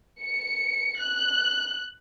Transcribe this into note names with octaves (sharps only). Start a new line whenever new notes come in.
C#7
F#6